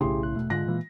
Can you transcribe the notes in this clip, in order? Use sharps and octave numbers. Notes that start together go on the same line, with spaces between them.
B1 A2 C#3 G4 G#4 C6
F#6
E1 B2 A3
G#2 D3 G#3 F4 F#6 A#6
A#2 E3 A#3